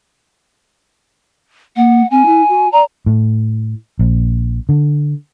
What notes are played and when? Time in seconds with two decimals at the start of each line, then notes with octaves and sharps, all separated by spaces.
1.77 A#3 F#5
2.11 C4 G#5
2.26 E4
2.49 F#4
2.72 D5 A#5
3.06 A2
3.99 A#1
4.69 D3